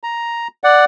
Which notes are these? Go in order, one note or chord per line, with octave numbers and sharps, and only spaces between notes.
A#5
D5 F#5